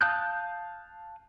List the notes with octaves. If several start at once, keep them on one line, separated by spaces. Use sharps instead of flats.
F5 A5 D#6 F#6 G6